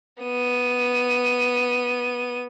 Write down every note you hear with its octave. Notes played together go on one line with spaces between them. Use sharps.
B3 D#7